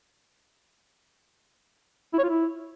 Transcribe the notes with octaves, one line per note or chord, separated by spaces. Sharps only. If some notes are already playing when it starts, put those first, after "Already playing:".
E4
C#5
F4
E4